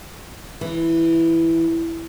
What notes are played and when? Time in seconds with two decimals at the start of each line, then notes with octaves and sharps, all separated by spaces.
0.61 E3